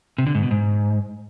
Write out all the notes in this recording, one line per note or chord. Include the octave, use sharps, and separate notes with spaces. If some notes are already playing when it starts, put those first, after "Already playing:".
C3
D3
G#2
B2
G#2